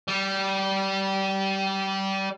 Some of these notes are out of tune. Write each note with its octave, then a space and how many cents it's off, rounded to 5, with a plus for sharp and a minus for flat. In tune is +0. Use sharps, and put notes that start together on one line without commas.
G3 -20